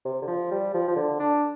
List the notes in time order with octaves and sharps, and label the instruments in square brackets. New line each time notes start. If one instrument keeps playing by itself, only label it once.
[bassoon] C3
D3
F3
G3
F3
F3
D3
D4